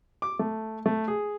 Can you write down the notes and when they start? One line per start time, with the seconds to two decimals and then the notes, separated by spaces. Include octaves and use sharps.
0.22 D6
0.39 A3
0.86 A3
1.08 G#4